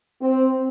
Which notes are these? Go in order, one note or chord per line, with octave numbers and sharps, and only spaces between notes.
C4